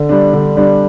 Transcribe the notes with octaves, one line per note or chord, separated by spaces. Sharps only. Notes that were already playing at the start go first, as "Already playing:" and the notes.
Already playing: D3
G3 D4
D3
G3 D4